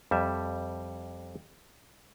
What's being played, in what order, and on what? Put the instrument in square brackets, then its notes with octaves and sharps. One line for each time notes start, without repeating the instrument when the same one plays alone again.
[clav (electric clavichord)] F2 G3 E5